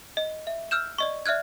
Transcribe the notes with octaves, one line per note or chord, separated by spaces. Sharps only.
D#5
E5
E6 F6 G6 E7
D5 D#5 C#6
D5 E5 F6 F#6 G#6